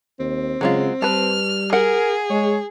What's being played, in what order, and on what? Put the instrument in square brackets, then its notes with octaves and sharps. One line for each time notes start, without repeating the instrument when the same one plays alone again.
[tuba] D#2 [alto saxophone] C4
[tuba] C#3 [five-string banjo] F#3 G#3 F4
[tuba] G3 [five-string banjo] B4 A5 [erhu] F6
[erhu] G#4 [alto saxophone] A#4 [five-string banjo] F#5
[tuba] G#3 [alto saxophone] C#5